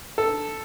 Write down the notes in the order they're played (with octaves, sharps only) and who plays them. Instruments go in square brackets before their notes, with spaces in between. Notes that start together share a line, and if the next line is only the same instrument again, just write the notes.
[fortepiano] A4